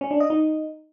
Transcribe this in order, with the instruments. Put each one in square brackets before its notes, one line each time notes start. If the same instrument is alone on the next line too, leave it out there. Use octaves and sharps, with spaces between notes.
[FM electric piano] C#4
D4
D#5
D#4